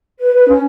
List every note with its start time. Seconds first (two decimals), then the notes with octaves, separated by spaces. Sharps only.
0.18 B4
0.33 B4
0.47 C#4